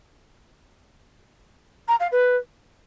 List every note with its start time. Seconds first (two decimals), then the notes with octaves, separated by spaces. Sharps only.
1.88 A#5
1.99 F5
2.11 B4